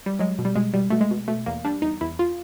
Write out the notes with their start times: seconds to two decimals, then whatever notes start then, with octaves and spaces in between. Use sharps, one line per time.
0.06 G3
0.19 F#3 G#3
0.38 B2
0.45 G3
0.55 B2 G#3
0.74 B2 G3
0.90 B2 A3
1.01 G#3
1.11 B2
1.28 B2 A3
1.46 E2 A#3
1.65 G3 D4
1.82 E2 D#4
2.01 E2 E4
2.19 F4